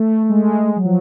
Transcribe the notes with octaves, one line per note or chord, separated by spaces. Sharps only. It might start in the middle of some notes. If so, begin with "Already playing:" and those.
Already playing: A3
A3
G#3
G#3
F#3
F3